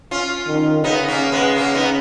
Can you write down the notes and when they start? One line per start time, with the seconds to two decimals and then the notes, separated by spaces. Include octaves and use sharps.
0.11 C#4 F4
0.47 D#3
0.84 C#3 B3 D#4
1.08 A#3 C#4
1.32 G#3 B3
1.56 A#3 C#4
1.75 B3 D#4